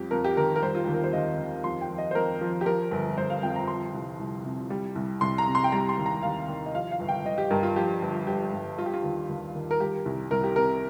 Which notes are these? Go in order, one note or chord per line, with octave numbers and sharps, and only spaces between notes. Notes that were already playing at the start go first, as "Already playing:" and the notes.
Already playing: F2 G3 G4
F2 A#4
G4
D#3 A#4
A#4
G3 C5
F4
D#2 G4
A#4
C5
D#2 D#5
D#3
F2 C6
G5
F3
D#5
C5
F2 A#4
F3
G4
F3 A#4
G1
G1 C5
F5
F2 G5
A#5
F3 C6
C2
C2
C3
G3
C2
C2 C6
A#5
C3
C6
G5
G3 A#5
C6
D#2
A#5
D#2 F5
D#3
D#5
F3 F5
F5
G1
G5
G1 D#5
G4
G2 A#4
F4
F3 G4
G1
G1 G4
G2
G3 F4
G4
F4
D#2
D#2
D#3
A#4
G3 G4
C2
C2 A#4
G4
C3 A#4